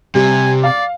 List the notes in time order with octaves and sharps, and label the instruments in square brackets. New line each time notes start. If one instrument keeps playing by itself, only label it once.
[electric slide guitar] C3 [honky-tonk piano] G3 [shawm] G#5
[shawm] D5 [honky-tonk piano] F5